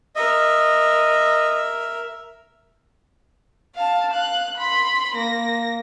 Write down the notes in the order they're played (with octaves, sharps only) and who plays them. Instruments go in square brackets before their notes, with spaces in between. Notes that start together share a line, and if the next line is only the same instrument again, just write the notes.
[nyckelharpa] A#4 E5 [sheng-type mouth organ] D#5
[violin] F5 A5
F5 F#6
B5 C6
A#3 A#6